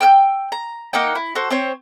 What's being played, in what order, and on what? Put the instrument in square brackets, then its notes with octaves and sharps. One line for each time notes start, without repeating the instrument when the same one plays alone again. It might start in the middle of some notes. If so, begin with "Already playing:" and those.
[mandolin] G5 E6 F#6 G6
A#5
A#3 D#4 F#5 G5
E4
F#4 A4 C5
C4 C5 C#5